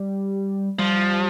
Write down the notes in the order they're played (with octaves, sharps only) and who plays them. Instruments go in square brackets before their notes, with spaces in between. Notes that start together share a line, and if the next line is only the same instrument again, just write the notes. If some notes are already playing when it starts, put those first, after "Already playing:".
Already playing: [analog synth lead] G3
[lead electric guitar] F3 [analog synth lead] G3